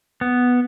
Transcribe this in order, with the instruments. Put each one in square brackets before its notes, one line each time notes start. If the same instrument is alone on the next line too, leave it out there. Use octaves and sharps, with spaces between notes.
[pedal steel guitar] B3